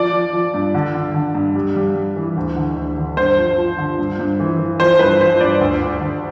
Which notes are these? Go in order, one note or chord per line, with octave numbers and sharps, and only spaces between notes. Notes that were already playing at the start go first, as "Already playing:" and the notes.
Already playing: F3 D5
F3
F3
G2
D3
D3
D3
G2
G3
G3
G3
E3
D2
D3
D2
D3
G2 C5
F3
F3
D3
G2
G2
E3
E3
F3 C5
G2 B4
F3 C5
G2 D5
D2
D2
D3